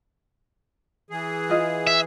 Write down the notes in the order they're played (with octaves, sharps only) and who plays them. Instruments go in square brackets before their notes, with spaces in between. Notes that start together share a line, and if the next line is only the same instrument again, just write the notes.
[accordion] E3 G#4
[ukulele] F4 D#5 F5
[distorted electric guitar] E5